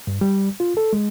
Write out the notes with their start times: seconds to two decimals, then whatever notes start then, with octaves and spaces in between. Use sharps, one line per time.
0.07 G2
0.21 G3
0.60 F4
0.77 A4
0.93 G#3